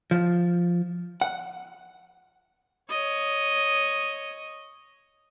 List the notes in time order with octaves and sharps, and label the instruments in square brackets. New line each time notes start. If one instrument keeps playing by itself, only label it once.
[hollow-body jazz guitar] F3
F#5
[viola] C#5 D#5